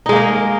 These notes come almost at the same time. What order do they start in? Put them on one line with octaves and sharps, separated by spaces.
D#4 G#3 A#3 A#4